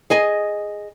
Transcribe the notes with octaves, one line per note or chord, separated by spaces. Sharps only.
G#4 D#5 G#5